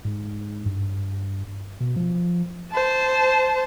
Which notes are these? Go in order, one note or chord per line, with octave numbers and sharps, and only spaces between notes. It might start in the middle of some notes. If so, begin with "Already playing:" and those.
G#2
G2
B2
F3
C5 A5